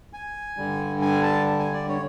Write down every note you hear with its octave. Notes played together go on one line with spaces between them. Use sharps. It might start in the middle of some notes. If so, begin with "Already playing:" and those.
G#5
G2 D3 G3
G#5
A5
G#5
D5
C#5